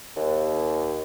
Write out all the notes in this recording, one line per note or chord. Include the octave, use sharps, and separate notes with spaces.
D#2